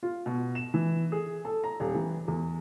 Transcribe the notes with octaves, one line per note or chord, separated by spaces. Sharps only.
F4
B2
E7
E3
G#4
A4
A#5
D#1
E3
E2